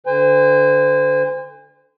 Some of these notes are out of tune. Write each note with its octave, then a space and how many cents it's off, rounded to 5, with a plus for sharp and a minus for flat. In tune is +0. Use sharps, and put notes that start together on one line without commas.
D3 +0 C5 -30 G#5 -40